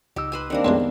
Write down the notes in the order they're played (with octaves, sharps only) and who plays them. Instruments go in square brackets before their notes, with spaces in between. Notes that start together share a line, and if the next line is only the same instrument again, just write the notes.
[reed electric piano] C#2 E6 [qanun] D#4 G4
[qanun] B4 C5 G#5
[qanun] D#3 G3 A#4 [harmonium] A#3 C4 D4
[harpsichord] F2 C3 G#3 [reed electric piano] B3 [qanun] C6